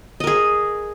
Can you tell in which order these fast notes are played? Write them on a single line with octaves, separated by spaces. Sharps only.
D#5 A#4 G#4